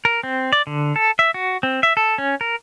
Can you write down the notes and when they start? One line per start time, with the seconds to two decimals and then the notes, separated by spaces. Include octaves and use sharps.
0.05 A#4
0.23 C4
0.53 D5
0.67 D3
0.96 A4
1.19 E5
1.34 F#4
1.63 C4
1.83 E5
1.97 A4
2.18 C#4
2.41 A#4